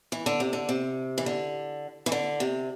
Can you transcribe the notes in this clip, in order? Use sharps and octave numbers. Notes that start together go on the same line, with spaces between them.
E3
D3
C3
D3
C3
E3
D3
E3
D3
C3